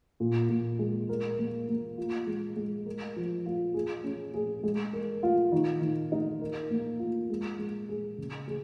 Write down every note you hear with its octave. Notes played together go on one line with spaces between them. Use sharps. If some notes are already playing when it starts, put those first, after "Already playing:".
A#2
A#2
G#3
A#4
A#3
A#3
F4
G#3
G#3
A#4
F3
F4
G#4
C#4
G#4
G#3
A#4
F4
D#3
D#3
D#4
A#4
A#3
F4
G#3
G#3
G#4
C#3
G#4